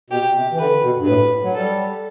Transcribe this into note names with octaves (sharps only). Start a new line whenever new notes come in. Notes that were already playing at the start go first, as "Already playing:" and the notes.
B2 G4
C3
E3
D3 B4
B2
G2
A2 B4
F#3
G3 A4